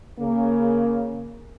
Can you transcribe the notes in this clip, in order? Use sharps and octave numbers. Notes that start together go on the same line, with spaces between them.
C#3 A#3